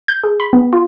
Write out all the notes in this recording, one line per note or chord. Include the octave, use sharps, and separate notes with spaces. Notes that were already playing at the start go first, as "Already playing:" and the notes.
G6
G#4
B5
B3
F4